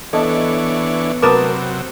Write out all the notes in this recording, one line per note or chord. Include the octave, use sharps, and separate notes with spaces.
E3 B3 D4 A4 C#5 D#5 A5
C3 F#3 A#4 B4 A5 D6 D#6